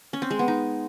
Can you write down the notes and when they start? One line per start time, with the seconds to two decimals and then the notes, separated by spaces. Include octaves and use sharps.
0.13 C#4
0.22 C4
0.31 G#3
0.39 B3
0.48 D#4